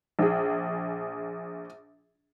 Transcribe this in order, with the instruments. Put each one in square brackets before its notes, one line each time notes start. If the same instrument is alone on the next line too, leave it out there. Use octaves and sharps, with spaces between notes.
[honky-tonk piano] A#1 G#4